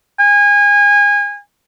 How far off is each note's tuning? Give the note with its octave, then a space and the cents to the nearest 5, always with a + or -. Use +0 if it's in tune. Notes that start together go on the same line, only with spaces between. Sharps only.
G#5 -25